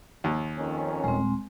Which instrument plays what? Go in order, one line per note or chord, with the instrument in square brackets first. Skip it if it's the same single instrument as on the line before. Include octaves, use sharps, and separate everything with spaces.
[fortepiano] D#2
[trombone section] F2 D#3 C#4
[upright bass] D#1 [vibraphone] G#3 C4